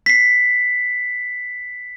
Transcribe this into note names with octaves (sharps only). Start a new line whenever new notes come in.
B6 C7